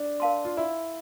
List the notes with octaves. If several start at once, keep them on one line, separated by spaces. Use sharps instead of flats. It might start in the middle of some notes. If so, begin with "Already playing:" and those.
Already playing: D4
A#4 F5 A5 C6
F4
E4